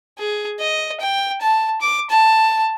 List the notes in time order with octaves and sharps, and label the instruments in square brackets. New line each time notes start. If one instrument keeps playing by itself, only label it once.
[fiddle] G#4
D#5
G5
A5
D6
A5